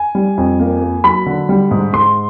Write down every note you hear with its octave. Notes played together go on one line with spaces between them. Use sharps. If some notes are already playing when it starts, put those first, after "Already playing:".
Already playing: G#5
G3
F2
A#3
A#3
F#3 B5
D3
G3
G#2
G#2 C6